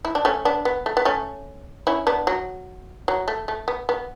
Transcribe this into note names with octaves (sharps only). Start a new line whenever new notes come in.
E4
D4
A3 C#4
B3 D4
B3
A3
B3
A3 C#4
C#4 E4
B3 D4
F#3
F#3
A3
A3
B3
B3